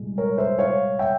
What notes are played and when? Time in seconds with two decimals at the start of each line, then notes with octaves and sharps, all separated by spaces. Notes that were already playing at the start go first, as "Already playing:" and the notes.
Already playing: C2 A#2 G#3
0.18 A#4 C#5
0.38 C5 E5
0.59 C#5 F5
0.99 E5 G5